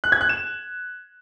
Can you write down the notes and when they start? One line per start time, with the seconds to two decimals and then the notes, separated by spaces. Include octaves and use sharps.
0.04 F#6
0.12 G#6
0.21 F#6
0.29 E7